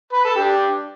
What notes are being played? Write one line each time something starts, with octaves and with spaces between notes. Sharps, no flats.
B4
A4
D4 G4